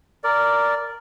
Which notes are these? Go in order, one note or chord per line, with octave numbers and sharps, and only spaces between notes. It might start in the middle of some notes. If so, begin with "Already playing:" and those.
A#4 D5